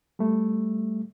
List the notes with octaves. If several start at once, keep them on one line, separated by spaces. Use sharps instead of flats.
G3 A3